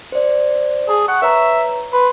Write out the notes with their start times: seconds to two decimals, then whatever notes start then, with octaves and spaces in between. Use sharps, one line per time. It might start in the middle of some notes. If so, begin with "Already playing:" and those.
0.12 C5 D5
0.89 G#4 A5
1.08 F#5 C#6
1.22 B4 C#5 E5 A#5
1.93 B4 C6